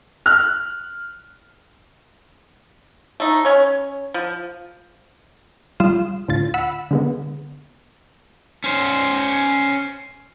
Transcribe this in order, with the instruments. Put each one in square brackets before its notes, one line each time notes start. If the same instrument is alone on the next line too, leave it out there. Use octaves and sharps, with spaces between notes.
[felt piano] F6 F#6
[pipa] A3 D#4
C#4 C#5
F3
[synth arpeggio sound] G3 G#3 F4 F5 D#6 E7
D2 A2 F4 A6
F#5 B5 E6
D3 G#3 B3
[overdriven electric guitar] C#4 C5